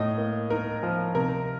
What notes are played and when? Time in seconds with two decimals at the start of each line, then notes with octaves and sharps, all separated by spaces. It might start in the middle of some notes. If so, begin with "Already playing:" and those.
Already playing: A2 D#5
0.18 A#3
0.50 D#4 A#4
0.83 F3
1.15 C3 A#4